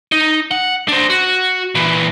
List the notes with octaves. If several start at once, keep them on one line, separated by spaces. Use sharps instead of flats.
D#4
F#5
D4 C5
F#4
A#2 E3